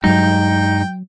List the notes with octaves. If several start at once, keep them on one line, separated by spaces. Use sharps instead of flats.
G2 F#3 G#3 D#4 G5